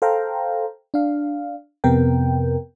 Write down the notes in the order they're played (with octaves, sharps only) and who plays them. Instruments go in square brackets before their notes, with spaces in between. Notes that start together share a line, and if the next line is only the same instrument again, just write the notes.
[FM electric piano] A4 C5 F5 G5 A#5
D4 F5
F2 C3 B3 A#4 G5